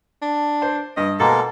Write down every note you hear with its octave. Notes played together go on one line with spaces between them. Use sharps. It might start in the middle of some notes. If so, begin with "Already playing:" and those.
D4
C5
G2 D#5
B2 G#3 A#3 A4 A#4